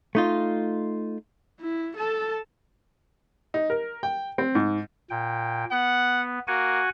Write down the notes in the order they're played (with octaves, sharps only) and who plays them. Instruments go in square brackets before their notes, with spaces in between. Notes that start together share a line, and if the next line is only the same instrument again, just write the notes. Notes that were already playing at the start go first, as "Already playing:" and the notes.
[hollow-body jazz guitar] A3 D#4 F4
[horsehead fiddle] E4
A4 A5
[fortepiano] D#4
A#4
G5
C4
G#2
[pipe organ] A#2 G5
[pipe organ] B3 [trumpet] F#5
[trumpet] A#3 [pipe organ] F#4 F#5 G#5